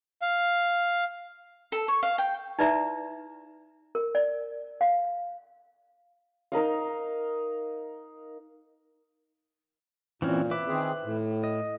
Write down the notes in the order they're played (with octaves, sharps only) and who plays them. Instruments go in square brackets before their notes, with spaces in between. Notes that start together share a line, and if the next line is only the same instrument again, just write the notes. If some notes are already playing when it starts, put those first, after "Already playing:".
[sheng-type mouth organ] F5
[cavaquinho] A4
C#5
F5
G5
[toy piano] D#4 E4 B4 D5 E5 A#5
A#4
D5
F5
[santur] D#4 A#4 D#5 F5
[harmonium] A#2 [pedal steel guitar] E3 C4 C#4
[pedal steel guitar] B4 E5 D6
[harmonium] D#3 C4 G#4
A2
[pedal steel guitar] D#5